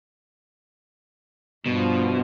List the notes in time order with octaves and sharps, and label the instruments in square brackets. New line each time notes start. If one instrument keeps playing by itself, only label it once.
[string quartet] G2 F3 [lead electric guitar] B2